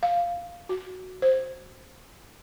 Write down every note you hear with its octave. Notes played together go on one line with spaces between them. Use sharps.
F5
F#4
C5